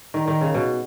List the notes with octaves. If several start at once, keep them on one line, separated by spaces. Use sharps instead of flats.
D#3
D#3
C#3
B2